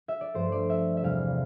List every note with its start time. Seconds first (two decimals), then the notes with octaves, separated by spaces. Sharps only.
0.08 E5
0.21 D5
0.34 G2 F3 A3 C5
0.52 D5
0.70 E5
0.97 E5
1.02 E2 C3 G3 F5